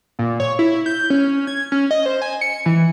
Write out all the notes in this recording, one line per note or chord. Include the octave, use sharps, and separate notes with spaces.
A#2
C#5
E4
G6
C#4
G#6
C#4
D#5
C5
G#5
C#7
E3